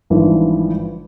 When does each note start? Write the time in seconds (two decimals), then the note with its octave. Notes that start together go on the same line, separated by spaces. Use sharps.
0.10 G#1 G2 D3 E3 F3